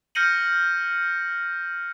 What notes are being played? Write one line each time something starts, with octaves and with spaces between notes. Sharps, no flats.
F6 G6 A#6 C#7 D#7 F#7